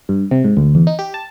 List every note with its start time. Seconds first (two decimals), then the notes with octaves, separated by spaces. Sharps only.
0.09 G2
0.31 C3
0.44 G#2
0.57 D2
0.75 E2
0.87 D#4
0.99 G4
1.14 A5